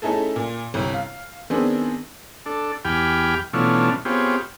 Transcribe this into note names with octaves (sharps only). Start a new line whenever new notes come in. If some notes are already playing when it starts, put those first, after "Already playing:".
A3 C#4 D#4 E4 G#4 A4
A#2
G1 C2
F5
D#3 B3 C4 D4 G#4
D4 A4
E2 G4 G5 G#5 B5 F6
B2 E3 A3 C#4 D4 F4
B3 C4 F4 G4 G#4 C#5